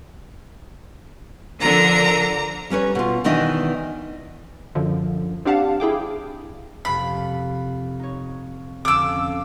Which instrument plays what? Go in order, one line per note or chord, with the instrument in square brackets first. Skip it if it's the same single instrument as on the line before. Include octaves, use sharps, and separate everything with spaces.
[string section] D3 F3 A#4 [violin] A#5
[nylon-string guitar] G3 C#4 B4 C#5
B2 F4
B2 D#3 E3 D4 D#5
[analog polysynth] F#2 D3 F3
C4 D4 G4 F5 F#5 A5
E4 G#4 G5 D6
[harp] F2 C3 [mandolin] B5
[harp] D#4 C#5
[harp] F2 D3 C#4 [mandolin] D6 E6